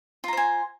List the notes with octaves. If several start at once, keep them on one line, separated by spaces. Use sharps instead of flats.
F4 C5 G#5 A#5